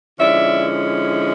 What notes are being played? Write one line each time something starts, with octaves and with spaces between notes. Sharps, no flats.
D3 F3 G#3 C#4 E4 D5 E5